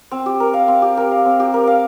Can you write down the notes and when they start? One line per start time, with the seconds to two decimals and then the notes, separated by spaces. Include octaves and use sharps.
0.11 C4
0.26 G4
0.40 A#4
0.54 F5
0.68 C4
0.82 G4
0.97 A#4
1.12 F5
1.25 C4
1.40 G4
1.54 A#4
1.67 F5